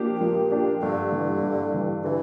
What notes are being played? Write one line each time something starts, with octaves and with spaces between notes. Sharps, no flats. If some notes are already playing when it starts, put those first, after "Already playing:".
Already playing: F3 A#3 D4 G4
A#2 F3
A#3 D4 G4
G2 D3
E3 G3
G2
E3 G3
D3 E3